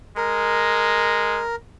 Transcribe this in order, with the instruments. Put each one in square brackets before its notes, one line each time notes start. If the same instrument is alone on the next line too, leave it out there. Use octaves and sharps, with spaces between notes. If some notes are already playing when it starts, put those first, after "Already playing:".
[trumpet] G#3 [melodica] A#4